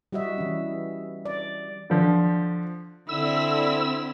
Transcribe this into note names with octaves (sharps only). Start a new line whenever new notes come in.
G3 F#4 D#5 E5
E3 C#4
D5
D3 F3
D3 C4 E4 E6